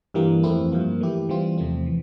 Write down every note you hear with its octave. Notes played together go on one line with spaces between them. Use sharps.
G2 E3 G3 A#3
F2 E3 A3 C4 E4
G2 F3 A#3
E3 A3 E4 G4
E3 G3 C4 F4
E2 C3 F3 A3 C4
E3